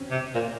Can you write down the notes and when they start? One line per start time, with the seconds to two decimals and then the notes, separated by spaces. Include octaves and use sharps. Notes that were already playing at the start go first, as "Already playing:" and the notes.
Already playing: C4 C#4
0.11 C3
0.35 A#2